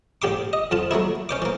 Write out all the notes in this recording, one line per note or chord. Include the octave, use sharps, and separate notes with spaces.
A1 G4 C6 D6
D#5
F2 F4 A5
F#3 A3 A#3 E4
C#4 C5 D6
E3 A#3